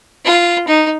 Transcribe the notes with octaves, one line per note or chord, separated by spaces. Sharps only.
F4
D#4